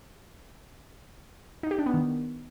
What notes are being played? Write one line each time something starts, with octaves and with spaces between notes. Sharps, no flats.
D#4
G4
D4
B3
D#3